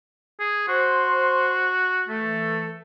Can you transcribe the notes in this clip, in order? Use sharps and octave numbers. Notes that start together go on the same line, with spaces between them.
G#4
F#4 C5 C6
E3 A3 A4